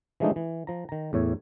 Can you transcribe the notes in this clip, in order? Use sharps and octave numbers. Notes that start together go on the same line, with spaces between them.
E3 F3 G#3 A3 D4 D#4
E3
F3 A#5
D#3 A#5
E2 A2 C#5